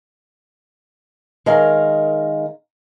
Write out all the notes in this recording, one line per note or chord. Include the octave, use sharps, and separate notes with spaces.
D#3 G#3 A#4 F5 A#5